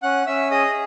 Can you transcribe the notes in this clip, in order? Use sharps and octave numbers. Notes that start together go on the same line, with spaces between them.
C#4 F#5 F#6
C#4 E5 E6
G#4 D#5 D#6